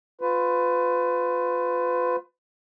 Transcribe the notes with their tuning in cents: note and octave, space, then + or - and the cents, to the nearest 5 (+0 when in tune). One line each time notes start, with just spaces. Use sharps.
F4 +20 B4 +30